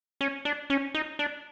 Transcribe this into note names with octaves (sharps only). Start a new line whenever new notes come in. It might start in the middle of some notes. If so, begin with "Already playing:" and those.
C#4
D4
C#4
D#4
D4